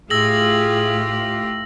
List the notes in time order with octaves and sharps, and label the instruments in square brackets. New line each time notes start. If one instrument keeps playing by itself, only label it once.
[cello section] A2 F4 G4 [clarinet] G#4 [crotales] E6 A#6 F#7